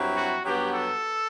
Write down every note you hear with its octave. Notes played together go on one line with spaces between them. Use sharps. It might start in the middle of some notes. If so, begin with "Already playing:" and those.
Already playing: G2 F#3 C4 E4
F#4
G2 F#3 B3 G4
A4